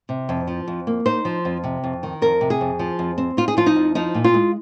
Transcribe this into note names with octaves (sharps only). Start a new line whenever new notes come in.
C3
F2
F3
F2
A#3
D#4 C5
F3
F2
C3
F2
D#3
F2 A#4
C3
G#4
F2
F3
F2
C4
D#4 F4
G#4
F3 F4
D#4
F2
F3 D#4
A#2
F4
G#3